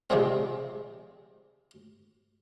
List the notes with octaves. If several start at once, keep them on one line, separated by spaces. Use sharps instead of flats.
C3 F3 G3 G#3 C4